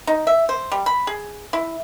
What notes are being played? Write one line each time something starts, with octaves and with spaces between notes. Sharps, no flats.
D#4
E5
C5
G3
B5
G#4
E4